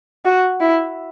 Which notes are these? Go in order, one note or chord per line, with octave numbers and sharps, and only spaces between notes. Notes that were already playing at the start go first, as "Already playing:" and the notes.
F#4
E4